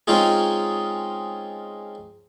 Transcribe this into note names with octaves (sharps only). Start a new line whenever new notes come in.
G#3 C4 C#4 D#4 F4 G#4